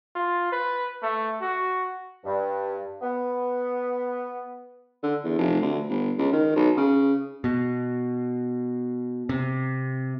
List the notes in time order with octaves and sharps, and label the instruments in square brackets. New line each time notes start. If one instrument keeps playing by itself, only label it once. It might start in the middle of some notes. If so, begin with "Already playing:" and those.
[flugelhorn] F4
B4
A3
F#4
[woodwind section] G2
B3
[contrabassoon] D3
E2
F1
D2
G1
C#2
D#3
B1
C#3
[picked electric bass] B2
C3